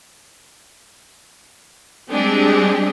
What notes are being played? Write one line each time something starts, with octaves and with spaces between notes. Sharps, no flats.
G3 G#3 C4 D4 G4 G#4